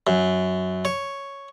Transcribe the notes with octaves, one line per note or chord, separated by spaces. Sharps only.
F#2
C#5